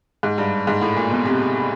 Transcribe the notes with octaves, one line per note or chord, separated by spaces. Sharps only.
G#2
G2
G#2
A2
A#2
B2
C3